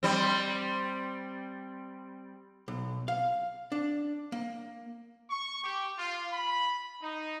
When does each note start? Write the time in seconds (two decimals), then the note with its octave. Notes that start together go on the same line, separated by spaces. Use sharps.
0.03 G3 C4
2.68 B1
3.08 F5
3.72 D4
4.32 A#3
5.30 C#6
5.63 G4
5.96 F4
6.32 B5
7.00 D#4